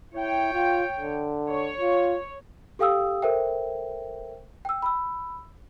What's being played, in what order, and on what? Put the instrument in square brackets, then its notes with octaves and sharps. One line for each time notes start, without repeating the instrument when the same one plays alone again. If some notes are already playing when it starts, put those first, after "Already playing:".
[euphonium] E4 [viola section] C#5 G5
[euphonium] F4
D3
[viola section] C#5
[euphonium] F4
[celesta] G4 A4 F5 G5 D#6 E6
A4 A#4 C5 E5 G5
G5 E6
B5 E6